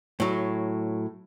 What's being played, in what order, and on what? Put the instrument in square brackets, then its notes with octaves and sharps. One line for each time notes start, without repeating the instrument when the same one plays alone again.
[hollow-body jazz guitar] A2 F#3